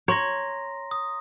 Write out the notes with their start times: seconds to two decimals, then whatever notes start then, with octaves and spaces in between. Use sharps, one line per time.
0.08 C#5 A#5 C6 A#6
0.91 D#6